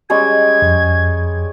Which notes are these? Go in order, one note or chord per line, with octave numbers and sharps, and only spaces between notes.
G3 G#3 C#4 G#6
F2